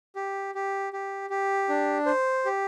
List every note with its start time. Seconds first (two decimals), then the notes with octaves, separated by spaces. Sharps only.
0.16 G4
0.55 G4
0.93 G4
1.30 G4
1.69 D4
2.06 C5
2.45 G4